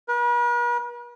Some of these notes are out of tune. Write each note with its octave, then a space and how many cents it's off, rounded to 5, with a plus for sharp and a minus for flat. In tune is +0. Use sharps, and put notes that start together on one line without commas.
B4 -45